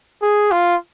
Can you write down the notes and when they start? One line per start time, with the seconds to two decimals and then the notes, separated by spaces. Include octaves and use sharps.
0.22 G#4
0.51 F4